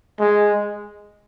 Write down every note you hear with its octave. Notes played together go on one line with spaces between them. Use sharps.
G#3